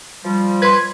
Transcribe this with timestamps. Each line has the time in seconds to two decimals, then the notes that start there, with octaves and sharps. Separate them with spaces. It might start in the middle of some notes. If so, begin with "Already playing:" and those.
0.24 F3 G3
0.62 B4 C6 G#6